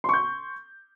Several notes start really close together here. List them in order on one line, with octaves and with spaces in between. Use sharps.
C6 C#6 G6